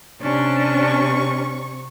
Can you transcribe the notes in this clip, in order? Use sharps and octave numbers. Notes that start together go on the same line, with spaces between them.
C3 C#4 D4 C#6